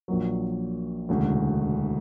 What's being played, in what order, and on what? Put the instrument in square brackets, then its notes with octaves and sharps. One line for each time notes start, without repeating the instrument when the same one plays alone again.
[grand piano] A#1 A#2 F#3
E1 D2 C#3